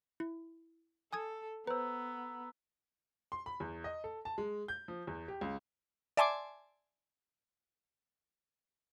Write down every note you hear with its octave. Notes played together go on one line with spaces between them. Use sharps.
E4
A4 G#5 D#6 G#6
B3 B4 C5 A#5 E6
C6
B5
E2
D#5
A4
A5
G#3
G6
F3
E2
G4
C#2
D5 E5 G#5 A5 C6 D6